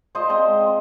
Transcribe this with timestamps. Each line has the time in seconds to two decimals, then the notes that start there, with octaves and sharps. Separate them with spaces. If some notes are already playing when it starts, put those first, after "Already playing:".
0.15 F3 C5 D#5
0.29 C4 C5 D#5
0.45 G#3
0.60 C4